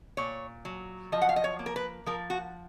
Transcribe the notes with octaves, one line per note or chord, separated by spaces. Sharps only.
A#2 C#5
F#3
F3 D#5
F#5
F5
D#5
C#5
A#3
A#4
B4
F3 A#4
F#4